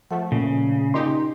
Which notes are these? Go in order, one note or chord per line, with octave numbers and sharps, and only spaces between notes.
F3 A3 F#5
A#2 C#3 C#4
A#2 D#4 G4 C6